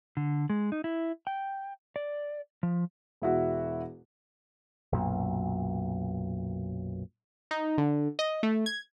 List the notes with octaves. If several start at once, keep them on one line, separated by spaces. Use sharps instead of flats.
D3
G#3
D#4
E4
G5
D5
F3
E1 E4 F#4
B1 F#2 A#2
D#4
D3
D#5
A3
G#6